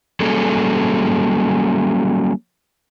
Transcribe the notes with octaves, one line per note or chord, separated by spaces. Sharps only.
F#3 G3 A#3 C#4 G#4 A4